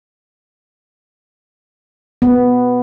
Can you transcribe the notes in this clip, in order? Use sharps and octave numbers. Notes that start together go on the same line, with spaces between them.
B3